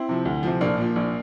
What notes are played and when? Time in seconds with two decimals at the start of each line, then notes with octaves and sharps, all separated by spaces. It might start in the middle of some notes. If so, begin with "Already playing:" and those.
Already playing: C4 E4
0.09 C3 F3
0.25 D2
0.43 C3 F3
0.61 A#1 A#3 D4
0.78 A#2 F3
0.96 A#1